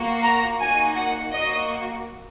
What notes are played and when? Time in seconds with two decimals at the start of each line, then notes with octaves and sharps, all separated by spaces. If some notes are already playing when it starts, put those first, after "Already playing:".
Already playing: A#3 F#4
0.23 A#5
0.59 A#3 D#4 F#4 G#5
0.96 F#5
1.31 A#3 F#4 D#5